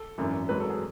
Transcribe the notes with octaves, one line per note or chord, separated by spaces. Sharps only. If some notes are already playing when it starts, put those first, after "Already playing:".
Already playing: A4
G#1 F#2 E3
G#1 G#2 F#3 B4
A4
G#4